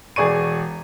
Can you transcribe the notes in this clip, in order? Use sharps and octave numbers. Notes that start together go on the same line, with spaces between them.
E1 G#4 D5 C#6 D#7